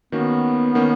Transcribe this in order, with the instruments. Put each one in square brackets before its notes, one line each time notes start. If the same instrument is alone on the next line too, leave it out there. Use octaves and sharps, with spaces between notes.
[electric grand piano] D#3 A#3 C#4 F#4 [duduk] B3
[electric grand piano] D#3 A#3 C#4